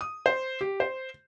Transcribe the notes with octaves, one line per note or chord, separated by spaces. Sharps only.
D#6
C5
G4
C5